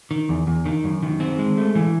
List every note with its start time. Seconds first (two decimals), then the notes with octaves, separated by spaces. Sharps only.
0.11 D#3
0.29 E2
0.47 E2
0.66 D#3
0.84 F#2
1.02 D#3
1.20 C4
1.39 G#3
1.57 A3
1.75 E3